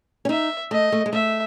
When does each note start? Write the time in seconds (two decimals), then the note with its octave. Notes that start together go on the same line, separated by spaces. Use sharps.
0.25 C#4
0.29 D#4 E5
0.71 A3 D#5
0.92 A3
1.06 G#3
1.13 A3 E5